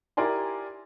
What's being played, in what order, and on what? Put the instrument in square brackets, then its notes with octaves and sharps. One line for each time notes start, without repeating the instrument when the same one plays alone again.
[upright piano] E4 G4 A#4 D5 G#5 C6